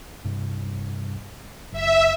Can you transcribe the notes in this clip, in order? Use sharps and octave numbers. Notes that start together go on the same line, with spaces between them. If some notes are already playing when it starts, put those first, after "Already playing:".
G2 C3
F#1 E5